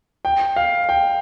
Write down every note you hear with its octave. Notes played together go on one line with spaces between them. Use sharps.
G5
F5
G5